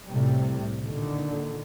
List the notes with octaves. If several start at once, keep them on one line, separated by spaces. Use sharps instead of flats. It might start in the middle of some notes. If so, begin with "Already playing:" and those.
C2 A2 C3 G3
A#2 D3 D#3